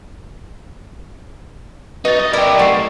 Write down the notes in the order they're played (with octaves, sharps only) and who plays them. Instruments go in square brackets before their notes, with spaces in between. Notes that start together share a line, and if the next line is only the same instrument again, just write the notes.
[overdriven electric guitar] D#4 [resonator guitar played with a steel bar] F#4 [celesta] B4 A6
[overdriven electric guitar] D#5
[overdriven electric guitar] E4 G4 [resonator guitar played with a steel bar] A#4 D5 [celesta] D#5
[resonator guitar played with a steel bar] A3 [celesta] F#5 C7